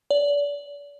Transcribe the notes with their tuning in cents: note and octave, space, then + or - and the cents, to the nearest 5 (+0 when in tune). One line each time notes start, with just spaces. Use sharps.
D5 -35